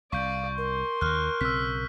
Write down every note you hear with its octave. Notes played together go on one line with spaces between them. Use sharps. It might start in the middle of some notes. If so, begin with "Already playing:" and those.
C2 D5 F5 C#6 G6
A#4 C6
D#2 D#3 F6 F#6
B1 C#3 C4 E6 F#6 B6